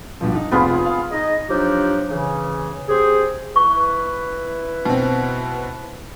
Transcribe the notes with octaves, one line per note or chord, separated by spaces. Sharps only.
G2 B2 F3
D#4
F1 B3 C4 F4 G#4 B5
F5
D#4 G#4 D#5
F3 F#3 D4 D#4 G4
C#3 E3
C4 G4 G#4
E4 B4 C#6
B2 C4